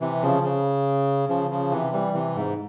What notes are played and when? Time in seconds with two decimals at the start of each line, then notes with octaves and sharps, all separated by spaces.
0.01 C3 E3
0.22 C#3 F3
0.43 C#3
1.29 C#3 F3
1.51 C#3 F3
1.72 C3 E3
1.93 E3 G3
2.14 C3 E3
2.36 G#2